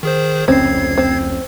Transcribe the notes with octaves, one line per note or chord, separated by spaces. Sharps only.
D#3 G#4 C5
F1 C#2 C4 C#4 G#6 C7
C4